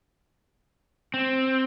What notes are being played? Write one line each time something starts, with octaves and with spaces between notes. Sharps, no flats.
C4